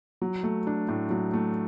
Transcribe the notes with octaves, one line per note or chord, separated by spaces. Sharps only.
F#3
A3
D4
A2
F#3
A3